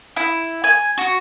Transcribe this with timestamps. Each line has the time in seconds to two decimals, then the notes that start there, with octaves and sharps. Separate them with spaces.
0.16 E4
0.64 G#5
0.98 F#4